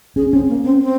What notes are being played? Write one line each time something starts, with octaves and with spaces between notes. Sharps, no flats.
C#4 G#4
C4 C#4
A#3
C4
C4